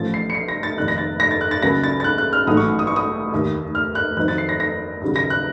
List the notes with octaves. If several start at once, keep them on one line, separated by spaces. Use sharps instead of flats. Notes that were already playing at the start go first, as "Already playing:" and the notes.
Already playing: A1 A2 F3 A3 C#4 A6
C7
C#7
C7
A#6
A6
F1 F2 C3 D#3 F#6
A#6
A6
A#6
A6
F#6
A6
C#2 C#3 F#3 A#3 C#4 A#6
A6
A6
F#6
F#6
F6
A1 A2 F#3 A3 D#4 D#6
C#6
D#6
C#6
D#6
F1 D#2 D#3
F6
F#6
F2 D#3 F#3 C4 D#4 F#6
A6
C7
A#6
A#6
D#2 C#3 F#3
A#6
F#6